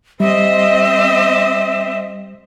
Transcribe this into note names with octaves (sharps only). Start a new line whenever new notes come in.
G3 C4 D#5 E5